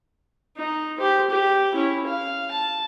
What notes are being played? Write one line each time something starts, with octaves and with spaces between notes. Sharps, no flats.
D#4
G4 C5
G4
C#4 E4
F5
A5